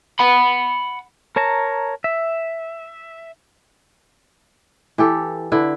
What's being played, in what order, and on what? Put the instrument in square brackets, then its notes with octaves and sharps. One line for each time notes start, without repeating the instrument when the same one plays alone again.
[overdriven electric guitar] F#5 B5
[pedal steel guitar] A#4 C#5 A5 A#5
E5
[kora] E3 G4 A4
D3 E4 B4